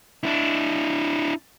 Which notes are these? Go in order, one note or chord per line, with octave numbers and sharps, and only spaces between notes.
D4 E4